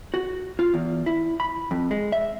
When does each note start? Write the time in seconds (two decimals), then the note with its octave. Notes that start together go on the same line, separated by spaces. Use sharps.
0.14 F#4
0.59 F4
0.74 E2
1.06 E4
1.40 B5
1.71 F2
1.91 G#3
2.12 E5